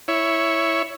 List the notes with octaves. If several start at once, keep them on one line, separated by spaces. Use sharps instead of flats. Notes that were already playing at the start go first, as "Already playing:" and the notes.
E4 C#5